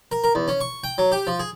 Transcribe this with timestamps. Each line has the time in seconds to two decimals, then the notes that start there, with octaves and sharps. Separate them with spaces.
0.12 A#4
0.24 A#4
0.35 E2
0.48 C#4
0.61 C#6
0.84 G5
0.98 F#3
1.12 G4
1.27 F3
1.39 G#4